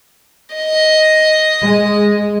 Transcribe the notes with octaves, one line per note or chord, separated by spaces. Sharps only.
D#5
G#3